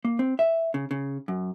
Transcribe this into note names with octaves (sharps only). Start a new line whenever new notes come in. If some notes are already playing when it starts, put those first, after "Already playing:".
A#3
C4
E5
C#3
C#3
F#2